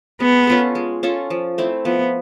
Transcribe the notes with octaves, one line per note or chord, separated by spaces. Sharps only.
G#3 B3
C#4 F4 A4
G#3
C#4 F4 A4
F3
A3 C4 E4
F3 B3